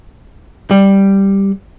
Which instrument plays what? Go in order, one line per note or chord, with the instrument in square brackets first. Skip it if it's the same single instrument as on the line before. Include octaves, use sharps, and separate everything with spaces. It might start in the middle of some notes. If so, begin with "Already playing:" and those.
[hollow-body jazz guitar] G3